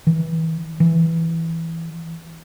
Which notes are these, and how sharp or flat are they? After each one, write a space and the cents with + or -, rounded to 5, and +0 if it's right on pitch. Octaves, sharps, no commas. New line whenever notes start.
E3 -25
E3 +0